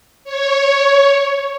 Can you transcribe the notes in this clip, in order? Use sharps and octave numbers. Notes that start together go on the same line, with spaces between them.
C#5